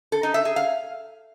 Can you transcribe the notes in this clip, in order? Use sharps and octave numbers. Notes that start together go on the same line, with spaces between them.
A4
D#4
E5
G#4
F5